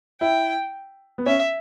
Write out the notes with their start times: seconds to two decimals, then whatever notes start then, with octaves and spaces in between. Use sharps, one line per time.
0.21 E4 G5
1.18 B3
1.26 C#4 E5